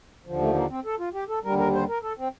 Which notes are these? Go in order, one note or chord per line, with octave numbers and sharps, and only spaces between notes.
D#2 D3 F3
A3
A#3
C4
A4
F4
G4
A4
D#2 D3 G3 A#4
A#4
C5
A#4
A4
C4